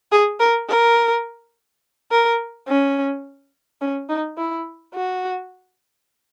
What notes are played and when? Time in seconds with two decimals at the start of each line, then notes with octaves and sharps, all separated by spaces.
0.12 G#4
0.40 A#4
0.69 A#4
2.11 A#4
2.68 C#4
3.81 C#4
4.09 D#4
4.37 E4
4.94 F#4